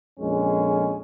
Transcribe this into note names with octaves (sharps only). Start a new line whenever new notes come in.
A#1 F2 G#3 C#4